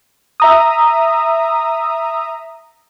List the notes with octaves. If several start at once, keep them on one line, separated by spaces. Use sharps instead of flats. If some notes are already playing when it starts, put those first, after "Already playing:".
E5 A#5 D#6